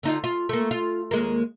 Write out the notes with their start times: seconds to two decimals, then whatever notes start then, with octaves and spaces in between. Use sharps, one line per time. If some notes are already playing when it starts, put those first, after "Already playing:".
0.03 D3 D#4 F4
0.24 F4
0.49 A3 A#3
0.71 F4
1.11 D#2 G#3 A#3